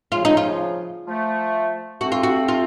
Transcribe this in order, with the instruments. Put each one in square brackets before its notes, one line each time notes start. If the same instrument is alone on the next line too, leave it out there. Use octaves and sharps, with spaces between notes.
[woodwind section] C#3 F3 [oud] F4
[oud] D#4
F4
[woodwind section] F3 A3
[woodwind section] A3 C4 [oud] F#4
[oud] F4
F#4
F4